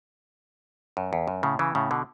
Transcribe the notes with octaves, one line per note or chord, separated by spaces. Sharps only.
F#2
E2
F#2
A2 C#3
C#3 E3
A2 C#3
B2 D3